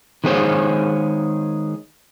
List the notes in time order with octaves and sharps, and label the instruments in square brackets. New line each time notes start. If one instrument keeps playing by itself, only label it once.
[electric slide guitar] D#3 G#3 B3 G#4 C5 C#5